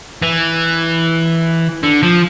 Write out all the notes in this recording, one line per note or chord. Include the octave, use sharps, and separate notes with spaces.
E3
D3
F3